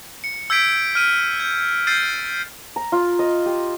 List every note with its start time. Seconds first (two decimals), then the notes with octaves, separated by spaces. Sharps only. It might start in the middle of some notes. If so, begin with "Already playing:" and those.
0.24 C#7
0.50 E6 G6 G#6 B6 D7
0.73 G6
0.95 F6 D#7
1.40 G6
1.87 E6 G6 A6 C7 D#7
2.76 A#5
2.92 F4
3.19 D#5
3.46 G4